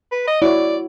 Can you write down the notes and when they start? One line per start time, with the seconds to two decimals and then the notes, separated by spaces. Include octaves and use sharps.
0.12 B4
0.27 D#5
0.42 E4 F#4 C#5 D5